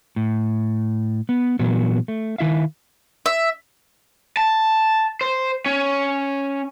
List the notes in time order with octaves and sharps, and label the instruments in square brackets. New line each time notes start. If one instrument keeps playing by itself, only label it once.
[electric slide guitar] A2
B3
A#2 E3 F#3 B3
A3
D#3 E4 E5 F5
[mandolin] E5
[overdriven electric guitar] A5
C5
C#4